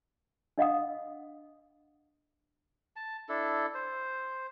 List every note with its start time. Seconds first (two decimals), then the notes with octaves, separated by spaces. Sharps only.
0.58 D4 D#5 F5 F#5 D#6
2.96 A5
3.29 D4 E4 A4
3.74 C5